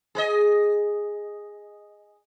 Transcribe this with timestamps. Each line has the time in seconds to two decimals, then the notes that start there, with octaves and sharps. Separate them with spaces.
0.15 G#4 B4 D#5